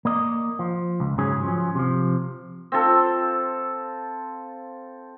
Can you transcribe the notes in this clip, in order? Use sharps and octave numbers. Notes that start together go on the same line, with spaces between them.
A#3 D5 D#5
F3
C#2
G#2 C#3 F#3 C#4 G#4
F3 F#3 C#4
C3 F3
C4 F4 A4